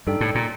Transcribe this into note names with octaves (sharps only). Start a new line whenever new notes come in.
G2 D#4 A4 D5 G5
A2
A#2